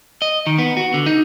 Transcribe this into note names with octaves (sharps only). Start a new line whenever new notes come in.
D#5
D#3
B3
F#4
D3
D#4